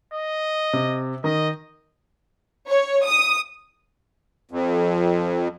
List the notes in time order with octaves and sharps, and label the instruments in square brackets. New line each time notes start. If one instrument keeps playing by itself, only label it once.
[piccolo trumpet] D#5
[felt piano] C3
[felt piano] D#3 [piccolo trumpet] D#5
[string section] C#5
D#6
[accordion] F2